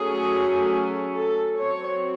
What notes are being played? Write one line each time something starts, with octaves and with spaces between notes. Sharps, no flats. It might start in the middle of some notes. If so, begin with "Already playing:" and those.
Already playing: F#3 A3 C#4 G#4
A4
F#3 C4 C#5